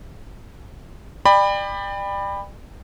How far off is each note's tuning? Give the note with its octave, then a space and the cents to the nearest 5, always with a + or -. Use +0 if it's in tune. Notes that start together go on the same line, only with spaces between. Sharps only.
D5 +30 G5 +30 B5 +0